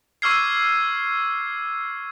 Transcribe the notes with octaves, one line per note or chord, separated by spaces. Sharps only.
C#6 D6 E6 F6 G#6 C7